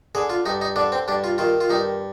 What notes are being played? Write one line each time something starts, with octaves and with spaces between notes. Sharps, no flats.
D3 G#4
F4
G2 D#4
D#4
D3 D4
C4
G2 D4
F4
D#3 F4
F4
G2 D#4